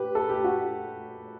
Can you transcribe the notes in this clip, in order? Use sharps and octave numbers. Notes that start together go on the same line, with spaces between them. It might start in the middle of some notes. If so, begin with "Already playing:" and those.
Already playing: G4 B4
A4
G4
F#4